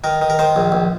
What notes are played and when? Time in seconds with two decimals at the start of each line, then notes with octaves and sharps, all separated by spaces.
0.04 D#3 A#4
0.22 D#3
0.30 A#4
0.39 D#3 C5
0.56 A#1
0.72 A#1